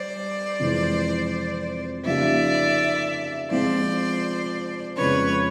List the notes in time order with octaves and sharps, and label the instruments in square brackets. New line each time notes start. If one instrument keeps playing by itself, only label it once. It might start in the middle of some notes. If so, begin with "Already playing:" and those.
Already playing: [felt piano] G3 [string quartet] C5 D5
[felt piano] F2 C3 E3 G#3
[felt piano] C#3 F3 A#3 D#4 G4 [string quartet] D5 E5
[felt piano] F3 G#3 C4 F4 [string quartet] C5 D5
[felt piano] F2 C#3 F3 G#3 C#4 [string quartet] B4 C#5